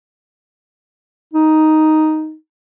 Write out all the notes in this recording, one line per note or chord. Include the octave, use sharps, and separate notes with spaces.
D#4